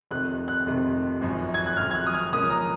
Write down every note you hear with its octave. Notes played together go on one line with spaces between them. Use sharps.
F1 F2 C3 D#3 F#6
F#6
F1 F2 C3 D#3
G#1 F#2 F3
G#6
F#6
G#1 F#2 F3 F6
G#6
F#6
D#6
F6
C#2 C#3 F3 A#3 C#4 D#6
A#5